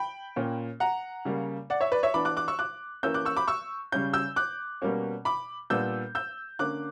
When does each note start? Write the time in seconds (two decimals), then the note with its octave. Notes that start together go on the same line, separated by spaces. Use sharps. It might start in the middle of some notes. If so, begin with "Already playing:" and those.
Already playing: G5 B5
0.36 A#2 A#3 C#4
0.80 F#5 A#5
1.25 C#3 G3 A#3
1.70 D5 F#5
1.81 C#5 E5
1.92 B4 D5
2.03 C#5 E5
2.14 E3 B3 D4 B5 D6
2.25 D6 F#6
2.37 D6 F#6
2.48 C#6 E6
2.59 D6 F#6
3.03 E3 A#3 C#4 E6 G6
3.14 D6 F#6
3.25 C#6 E6
3.37 B5 D6
3.48 C#6 E6
3.92 C#3 G3 C#4 G6
4.14 E6 G6
4.36 D6 F#6
4.82 B2 G3 A#3 C#4
5.25 B5 D6
5.70 A#2 G3 B3 D4 E6 G6
6.15 E6 G6
6.59 D3 A#3 C#4 D6 F#6